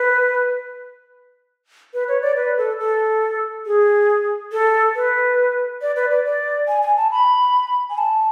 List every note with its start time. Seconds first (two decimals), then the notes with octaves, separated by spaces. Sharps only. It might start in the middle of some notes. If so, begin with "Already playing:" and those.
Already playing: B4
1.94 B4
2.08 C#5
2.22 D5
2.36 B4
2.58 A4
2.80 A4
3.66 G#4
4.52 A4
4.96 B4
5.82 D5
5.96 B4
6.11 D5
6.25 D5
6.68 G#5
6.82 G#5
6.97 A5
7.11 B5
7.90 G#5
7.98 A5